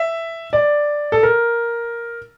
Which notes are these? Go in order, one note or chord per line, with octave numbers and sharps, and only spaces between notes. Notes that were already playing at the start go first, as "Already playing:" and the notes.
Already playing: E5
D5
A4
A#4